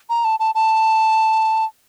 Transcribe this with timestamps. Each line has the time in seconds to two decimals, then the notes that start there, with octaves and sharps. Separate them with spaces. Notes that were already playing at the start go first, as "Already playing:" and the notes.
0.10 A#5
0.25 A5
0.39 A5
0.55 A5